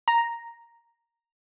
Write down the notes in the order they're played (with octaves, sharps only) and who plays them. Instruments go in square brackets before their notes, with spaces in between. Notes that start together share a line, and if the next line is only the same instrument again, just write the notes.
[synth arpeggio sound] A#5